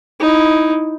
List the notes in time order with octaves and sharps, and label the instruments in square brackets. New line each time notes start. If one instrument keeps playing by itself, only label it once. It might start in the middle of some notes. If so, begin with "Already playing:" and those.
[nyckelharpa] D#4 E4